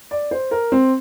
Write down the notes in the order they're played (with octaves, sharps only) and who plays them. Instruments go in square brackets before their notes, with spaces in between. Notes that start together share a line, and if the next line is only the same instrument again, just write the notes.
[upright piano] D5
C5
A#4
C4